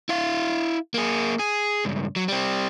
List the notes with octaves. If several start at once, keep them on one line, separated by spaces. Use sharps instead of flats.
E4 F5
A#3 G#4
G#4
C#2 G2
F#3
G3 C4